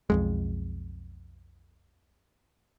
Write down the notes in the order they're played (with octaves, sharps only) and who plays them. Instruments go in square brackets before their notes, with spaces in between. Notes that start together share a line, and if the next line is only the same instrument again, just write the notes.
[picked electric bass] B1 F2 G#3